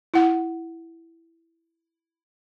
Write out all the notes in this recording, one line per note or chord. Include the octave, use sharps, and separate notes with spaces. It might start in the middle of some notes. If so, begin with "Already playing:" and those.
E4 F#5